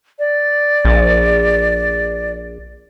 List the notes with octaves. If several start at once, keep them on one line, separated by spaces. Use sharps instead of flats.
D5
A#1